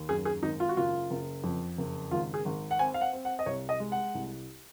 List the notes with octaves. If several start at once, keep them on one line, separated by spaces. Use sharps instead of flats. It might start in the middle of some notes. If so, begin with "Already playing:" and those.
Already playing: D#2
F#2 G#4
G#4
G#1 D#4
F4
F#4
F#1 F4
F#1
F2
F#1
G#1 F4
G#4
G#1
F#5
C4 G#5
F5
F#5
C4
F#5
D#5
C2 C#5
D#5
G#3
F#5
C2